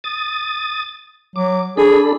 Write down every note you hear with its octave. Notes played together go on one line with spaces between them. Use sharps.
D#6 A6
F#3 D6
D4 G#4 A4 B5